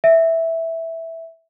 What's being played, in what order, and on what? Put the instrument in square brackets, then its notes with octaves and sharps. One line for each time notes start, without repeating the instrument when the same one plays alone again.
[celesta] E5